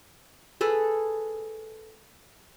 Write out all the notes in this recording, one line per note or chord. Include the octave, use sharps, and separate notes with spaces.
G#4 A4 B4